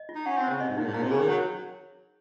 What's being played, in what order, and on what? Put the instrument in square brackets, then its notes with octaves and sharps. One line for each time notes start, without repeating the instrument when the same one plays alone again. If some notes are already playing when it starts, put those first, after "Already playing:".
Already playing: [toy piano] D#5
F4
[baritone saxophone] D#4
[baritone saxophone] C#4 [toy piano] F#5
[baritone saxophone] C4
[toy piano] C5
[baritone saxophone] C#3
[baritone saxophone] C3 [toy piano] D#5
[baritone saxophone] G#2
[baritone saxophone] A#2 [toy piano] D#4
[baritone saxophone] G#2
[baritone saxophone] A#2 [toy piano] A#5
[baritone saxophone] C3
[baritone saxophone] C#3 [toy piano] G#4
[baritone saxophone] D#3
[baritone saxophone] F#3 [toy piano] C#5